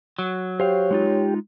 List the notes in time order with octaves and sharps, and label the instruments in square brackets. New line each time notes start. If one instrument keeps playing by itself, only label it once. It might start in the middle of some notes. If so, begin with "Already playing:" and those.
[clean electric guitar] F#3
[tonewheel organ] G4 [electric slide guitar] C5 F5 [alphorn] C#5
[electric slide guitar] G#3 D#4 F4